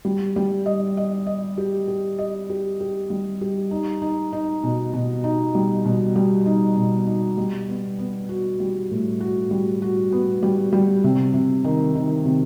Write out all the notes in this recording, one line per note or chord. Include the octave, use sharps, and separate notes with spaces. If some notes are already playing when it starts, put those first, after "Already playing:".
G3
G3
D#5
D#5
D#5
G4
G4
D#5
G4
G4
G3
G4
D#4
D#4
D#4
B2
B2
D#4
G3
B2
G3
D#4
B2
D#4
G3
B3
B3
F#4
G3
A2
F#4
G3
F#4
B3
G3
G3
C3
C3
D#3
D#3
C3